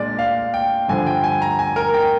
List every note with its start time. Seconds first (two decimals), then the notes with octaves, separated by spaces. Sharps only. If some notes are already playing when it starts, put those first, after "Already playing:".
Already playing: A#2 G#3 D4 D5
0.19 F5
0.54 G5
0.89 G2 D3 F3 G#5
1.07 G5
1.24 G#5
1.42 A#5
1.59 G#5
1.76 A#4
1.94 G5